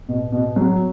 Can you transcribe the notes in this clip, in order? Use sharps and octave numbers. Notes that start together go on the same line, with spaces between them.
B2
B2
F#3